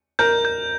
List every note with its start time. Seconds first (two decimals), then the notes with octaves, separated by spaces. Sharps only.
0.19 A#4 G6
0.45 G6